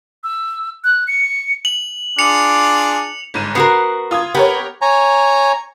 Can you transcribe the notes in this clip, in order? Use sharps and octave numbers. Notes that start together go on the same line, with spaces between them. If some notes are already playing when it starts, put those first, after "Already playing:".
E6
F#6
C#7
F#7
D4 F4 G#4 D6 C#7 F7
G1 G#2 D#7
B3 F#4 A#4 C7
F4 D#6 G#6
B3 G4 A#4 C#5
C#5 G#5 A#5